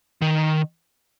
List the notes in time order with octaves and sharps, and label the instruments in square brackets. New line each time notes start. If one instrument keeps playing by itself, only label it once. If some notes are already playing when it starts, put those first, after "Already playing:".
[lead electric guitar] D#3